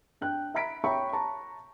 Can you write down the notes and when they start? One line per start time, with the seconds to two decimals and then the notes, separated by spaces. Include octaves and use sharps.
0.21 D4 G5 F#6
0.54 E5 A#5 B5 B6 D7
0.84 C#5 E5 G5 A#5 B5 C#6
1.13 A5 A#5 C#6